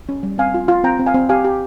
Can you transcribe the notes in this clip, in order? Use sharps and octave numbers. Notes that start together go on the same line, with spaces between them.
C#4
G3
C4 F5 G#5
F4
F4
C4 G5 A#5
C4
F5 G#5
C4
G4 F5 G#5
G4